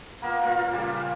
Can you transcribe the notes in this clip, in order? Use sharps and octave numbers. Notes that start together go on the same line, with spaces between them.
A#3 B3 F4 A#4
A#2 F4
C#3 G3 D5